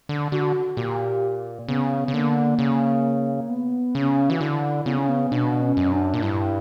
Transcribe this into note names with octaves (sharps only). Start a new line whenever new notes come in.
D3
D3 F#4
A#2 G4
C#3 B3
C#3
D3 A#3
C#3
B3
C#3 C#4
E3 F#4
D3 E4
C#3 B3
C#4
B3
B2 D4
C#4
F#2
D4
A#2
G2 E4